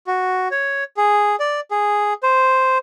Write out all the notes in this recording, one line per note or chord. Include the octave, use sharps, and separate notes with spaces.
F#4
C#5
G#4
D5
G#4
C5